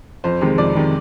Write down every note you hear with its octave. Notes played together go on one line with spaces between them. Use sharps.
F2 C5
C3 D#3 G#3
F2 D5
C3 D#3 G#3